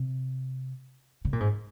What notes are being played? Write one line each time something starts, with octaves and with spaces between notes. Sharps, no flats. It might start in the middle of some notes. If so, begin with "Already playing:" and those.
Already playing: C3
C#3
A#2
G#2